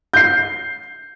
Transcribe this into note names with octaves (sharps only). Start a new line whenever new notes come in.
G6 C7